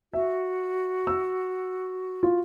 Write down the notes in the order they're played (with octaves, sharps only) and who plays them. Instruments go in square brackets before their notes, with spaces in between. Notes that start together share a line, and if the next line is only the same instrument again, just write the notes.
[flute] F#4 [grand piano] E5
[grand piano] E6
F4